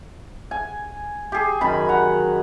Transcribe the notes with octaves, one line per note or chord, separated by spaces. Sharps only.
G#5
G4 G#4
F#2 D#3 B5
F#5 A#5